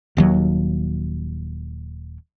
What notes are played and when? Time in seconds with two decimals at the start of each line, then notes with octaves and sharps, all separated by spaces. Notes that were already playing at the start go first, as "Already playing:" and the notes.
0.17 D#1 D#2 F#3